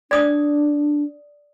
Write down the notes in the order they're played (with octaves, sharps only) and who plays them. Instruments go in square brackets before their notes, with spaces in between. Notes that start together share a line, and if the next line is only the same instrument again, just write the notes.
[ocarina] D4 [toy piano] D5 D#6